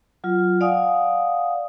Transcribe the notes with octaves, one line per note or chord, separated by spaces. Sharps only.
F#3 F4
D5 F5 F#5 G#5 D#6